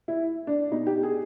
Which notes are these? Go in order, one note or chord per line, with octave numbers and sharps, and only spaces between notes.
E4
D4
B2 D#4
G4
G#4